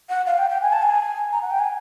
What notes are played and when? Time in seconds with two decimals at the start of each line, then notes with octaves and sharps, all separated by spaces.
0.09 F#5
0.27 F5
0.38 G5
0.50 G5
0.62 G#5
0.73 A5
0.82 G#5
1.32 A#5
1.42 F#5
1.51 G5
1.59 G#5